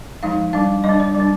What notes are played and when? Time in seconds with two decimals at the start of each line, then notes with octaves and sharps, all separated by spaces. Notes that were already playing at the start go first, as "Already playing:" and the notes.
0.23 F3 G#3 D#4 F5
0.53 G3 D4 F5
0.84 G3 D4 D#5
1.00 D5
1.15 G3 D4